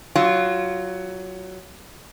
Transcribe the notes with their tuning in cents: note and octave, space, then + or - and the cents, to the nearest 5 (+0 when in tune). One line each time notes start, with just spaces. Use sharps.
F#3 +15 F4 -5